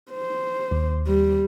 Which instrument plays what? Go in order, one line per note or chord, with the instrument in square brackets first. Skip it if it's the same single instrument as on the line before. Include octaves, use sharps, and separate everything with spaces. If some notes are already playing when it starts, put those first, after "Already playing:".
[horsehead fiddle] C5
[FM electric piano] D#2
[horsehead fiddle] G3